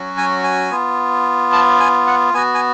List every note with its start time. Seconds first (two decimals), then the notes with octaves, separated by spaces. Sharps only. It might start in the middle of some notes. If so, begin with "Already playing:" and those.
Already playing: F#3 C#4 F#4
0.18 G#5
0.44 G#5
0.71 B3 F4
1.52 A5
1.80 G#5
2.07 F#5
2.34 B3 F#4 G#5
2.54 G#5